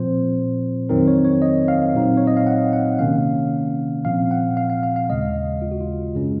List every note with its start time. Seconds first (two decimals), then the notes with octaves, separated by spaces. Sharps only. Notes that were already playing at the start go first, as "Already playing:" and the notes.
Already playing: A#2 F3 C4 C5
0.89 F2 D#3 F#3 C4 D#4 A#4
1.08 C#5
1.24 C#5
1.42 D#5
1.68 F5
1.95 A#2 F#3 C4 D#4
2.17 C#5
2.27 D#5
2.37 F5
2.47 F#5
2.73 F#5
2.99 C3 D#3 A#3 C#4 F5
4.05 A#2 F3 C4 F5
4.31 F#5
4.57 F5
4.70 F5
4.83 F5
4.96 F5
5.09 D#2 C#3 G#3 D#5
5.62 F4
5.71 F#4
5.81 F4
6.14 F#2 C#3 G#3 C#4